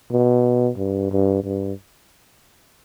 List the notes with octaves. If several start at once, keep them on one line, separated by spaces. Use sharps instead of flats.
B2
G2
G2
G2